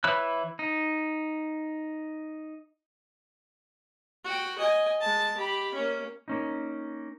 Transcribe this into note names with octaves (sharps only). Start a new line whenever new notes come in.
E3 E4 C#5 B5 F#6
D#4
F#4 G5
D#5 G#5
G#3 A5
G4 B5
A#3 C#4
A#3 C#4 D#4